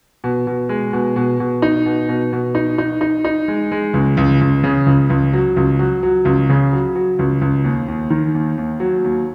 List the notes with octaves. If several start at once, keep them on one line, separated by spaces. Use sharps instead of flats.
B2
B2
G#3
B2
B2
B2
D#4
B2
B2
B2
D#4
D#4
D#4
D#4
G#3
G#3
C#2
C#2
C#2
C#3
C#2
C#2
F#3
C#2
F#3
F#3
C#2
C#3
F#3
F#3
C#2
C#2
D#2
D#2
D#3
D#2
D#2
F#3
D#2